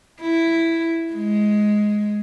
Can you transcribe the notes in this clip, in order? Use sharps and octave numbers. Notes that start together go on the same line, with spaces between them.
E4
G#3